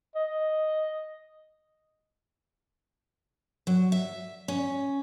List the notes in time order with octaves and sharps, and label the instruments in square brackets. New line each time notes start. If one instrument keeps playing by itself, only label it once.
[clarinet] D#5
[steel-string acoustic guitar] F#3
E5
C#4